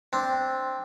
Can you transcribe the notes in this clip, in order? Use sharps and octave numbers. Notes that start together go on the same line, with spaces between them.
C4 D4